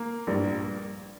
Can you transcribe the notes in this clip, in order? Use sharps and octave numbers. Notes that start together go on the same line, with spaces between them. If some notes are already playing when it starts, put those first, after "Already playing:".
Already playing: A#3
A#1 G2 G3